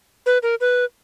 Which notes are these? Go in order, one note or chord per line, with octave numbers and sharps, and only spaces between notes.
B4
A#4
B4